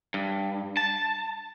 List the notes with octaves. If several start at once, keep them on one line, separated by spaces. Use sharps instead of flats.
G2
A5